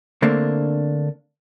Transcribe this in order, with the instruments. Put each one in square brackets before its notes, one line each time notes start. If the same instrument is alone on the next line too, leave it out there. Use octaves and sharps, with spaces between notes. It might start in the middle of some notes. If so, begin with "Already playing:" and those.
[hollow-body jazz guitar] D3 A3 A#3 C4 D4